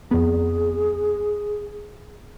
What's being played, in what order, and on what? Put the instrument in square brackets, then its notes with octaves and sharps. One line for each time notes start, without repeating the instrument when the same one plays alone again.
[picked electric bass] F2 B3 [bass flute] G#4